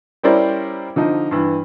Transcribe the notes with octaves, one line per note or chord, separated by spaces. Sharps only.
G3 C#4 E4 A#4 C5 D5
D3 F3 D#4
G2 E3